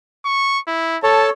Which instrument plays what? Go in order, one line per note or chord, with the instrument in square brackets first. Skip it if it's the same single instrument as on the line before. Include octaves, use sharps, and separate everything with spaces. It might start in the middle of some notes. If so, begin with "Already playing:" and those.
[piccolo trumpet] C#6
E4
[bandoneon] A4 C#5 [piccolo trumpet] A5